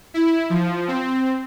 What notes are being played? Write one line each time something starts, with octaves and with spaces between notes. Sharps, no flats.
E4
F3
C4